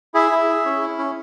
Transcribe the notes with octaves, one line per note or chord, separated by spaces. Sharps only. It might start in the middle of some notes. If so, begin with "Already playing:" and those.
E4 G#4 E5
E4
G#4
C#4
E4
C#4